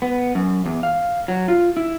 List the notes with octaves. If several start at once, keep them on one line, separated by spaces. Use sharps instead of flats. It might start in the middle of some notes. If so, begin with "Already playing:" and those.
B3
F#2
E2
F5
F#3
F4
E4